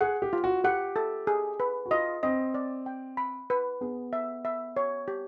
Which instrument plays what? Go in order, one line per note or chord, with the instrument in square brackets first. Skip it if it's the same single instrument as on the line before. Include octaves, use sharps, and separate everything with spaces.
[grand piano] G#4 [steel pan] F#5
[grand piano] G4
[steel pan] F4
[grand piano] F#4
[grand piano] G4 [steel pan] F#5
[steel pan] A4
G#4
B4
[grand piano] F#4
[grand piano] F4 [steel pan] D#5
[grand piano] C4 [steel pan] D#5
[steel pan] D5
G5
B5
B4
[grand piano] B3 [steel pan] G#4
[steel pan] E5
E5
C#5
G4